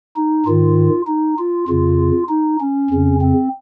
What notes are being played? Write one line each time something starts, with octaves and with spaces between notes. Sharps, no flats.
D#4
G#2 D#3 F4
D#4
F4
F2 C#3 F4
D#4
C#4
F2 C#3
C4